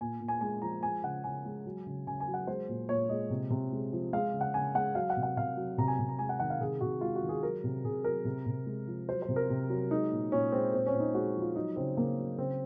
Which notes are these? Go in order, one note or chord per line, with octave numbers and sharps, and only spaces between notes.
A#2 G#5
A#2
G#5
G#3 G#5
F3 A#5
G#3 G#5
C#3 F#5
C#3 G#5
G#3
F#3
C#3
C#3 G#5
G#5
F#3
F#5
G#3 C5
A#2
A#2 C#5
G#3 D#5
C3
C3
G#3
F3
G#3 F5
C#3
F#5
C#3 G#5
G#3 F#5
F#3 F5
F#5
C3
F#5
C3 F5
F#3
C3 A#5
G#5
C3
A#5
G#3 G#5
F#5
D#3 F#5
F5
C3 G#4
C3 F#4
G#3 F4
F#4
D#3
G#4
F#3 A#4
C3
C3 G#4
F#3 A#4
C3
C3
G#3
F3
F#3 C5
C5
C3
A#4
C3
F#3
G#3 D#4
A#2
A#2 C#4
G#3 C4
A#2 C4
C#4
A#2
D#4
G#3 F#4
F3
F4
F#3 D#4
C#3 C4
C#3 A#3
F#3
C#3 C4